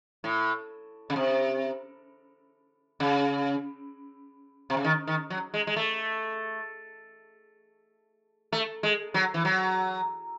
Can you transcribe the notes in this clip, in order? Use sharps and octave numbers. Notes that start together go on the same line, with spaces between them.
A2
C#3
C3
C#3
C3
C#3
D#3
D#3
F#3
G#3
G#3
A3
A3
G#3
F#3
E3
F#3